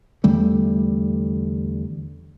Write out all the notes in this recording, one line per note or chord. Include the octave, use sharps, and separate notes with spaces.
E2 D3 G3 A3